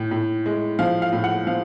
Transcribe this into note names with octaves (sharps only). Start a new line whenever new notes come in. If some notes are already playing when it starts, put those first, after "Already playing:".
Already playing: A2
A2
G#3
F3 F5
F5
A2
F#5
F3 F5